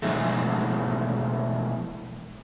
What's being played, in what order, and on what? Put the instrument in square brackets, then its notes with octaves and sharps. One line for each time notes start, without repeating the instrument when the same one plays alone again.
[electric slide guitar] B2 E3 F3 G#3 A3